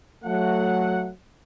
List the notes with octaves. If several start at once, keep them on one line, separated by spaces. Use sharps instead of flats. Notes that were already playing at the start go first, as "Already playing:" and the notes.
F#3 A3 F#5